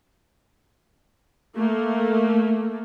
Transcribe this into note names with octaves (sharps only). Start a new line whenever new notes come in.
A3 A#3